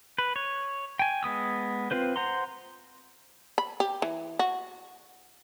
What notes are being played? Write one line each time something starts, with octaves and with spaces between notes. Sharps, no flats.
B4
C#5
G5 G#5
G#3 B3 D#6 E6
C4 F4 B4 C5
C5 F#5 A#5 C6
B5
G4
E3
F#4